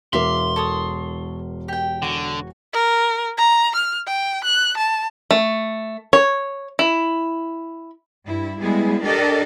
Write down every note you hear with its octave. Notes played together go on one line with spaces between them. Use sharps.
E1 E2 A#4 E5 F5 C6 D6
A4 C#5 D#6
G4 G5
D3 F#4 G#5
A#4
A#5
F6
G5
F#6
A5
A3
C#5
E4
G2 E4
G3 G#3 B3 E4 G#4
D4 G4 A4 A#4 D5 D#5